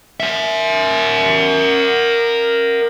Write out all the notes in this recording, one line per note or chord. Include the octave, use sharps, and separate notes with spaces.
A#4 E5